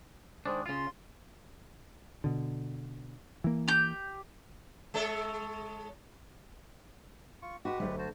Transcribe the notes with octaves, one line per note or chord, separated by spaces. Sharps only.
D#3 G#3 D4 C5
C#3 F4 C6
B2 D3
E3 A#3
G4 G6
G#3 A4 C#5
F4 C#6
G#3 F#4 G4 B4
F#1 D2 F#3 A3
F#4 C5 A5